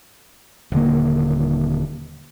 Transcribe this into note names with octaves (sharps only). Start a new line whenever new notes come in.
D#1 D3 A#3